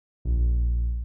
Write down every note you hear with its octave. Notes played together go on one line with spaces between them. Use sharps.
A#1